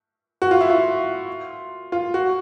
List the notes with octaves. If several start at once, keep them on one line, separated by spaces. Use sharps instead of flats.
F#4
F4
E4
F4
F4
F#4